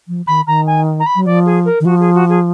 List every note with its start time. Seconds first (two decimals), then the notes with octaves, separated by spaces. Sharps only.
0.08 F3
0.27 D#3 B5
0.47 D#3 A#5
0.67 G#5
1.00 A#5
1.06 B5
1.15 F#3
1.26 F3 D5
1.46 G#4
1.65 A#4
1.80 D#3
1.85 F3 F#4
2.00 G#4
2.14 F#4
2.29 G#4